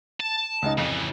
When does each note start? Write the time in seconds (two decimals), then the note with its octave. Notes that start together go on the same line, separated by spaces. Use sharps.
0.20 A5
0.62 C#2 D#4
0.78 F2 C#3 E3